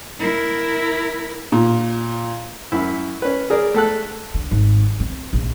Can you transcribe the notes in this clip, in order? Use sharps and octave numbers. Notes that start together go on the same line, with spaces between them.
E4 A#4
A#2
F#2 E4
C#4 B4
G#4 A#4 D5
A3 A4 F#6
D3
G#1
C4
A#1